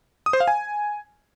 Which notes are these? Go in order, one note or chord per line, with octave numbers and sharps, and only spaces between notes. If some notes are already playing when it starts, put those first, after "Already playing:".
D#6
C5
F5
G#5